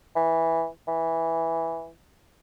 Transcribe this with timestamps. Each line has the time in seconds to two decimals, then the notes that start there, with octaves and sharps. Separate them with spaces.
0.16 E3
0.88 E3